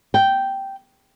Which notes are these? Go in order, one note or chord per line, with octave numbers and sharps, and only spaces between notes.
G5